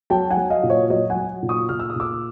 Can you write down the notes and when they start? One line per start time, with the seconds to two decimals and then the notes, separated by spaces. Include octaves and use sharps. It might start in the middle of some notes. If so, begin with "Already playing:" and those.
0.10 F#3 G5 A5
0.30 F#5 G#5
0.37 F#3
0.50 D#5 F5
0.63 A#2
0.70 C#5 D#5
0.90 F#3 C#5 D#5
1.10 F#5 G#5
1.16 F#3
1.43 A#2
1.49 C#6 D#6
1.69 A#2 F6
1.80 E6
1.90 D#6
1.96 A#2 D6 E6